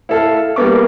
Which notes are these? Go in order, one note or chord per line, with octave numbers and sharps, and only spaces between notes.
E4 A4 F5
G3 A#3 B3 D6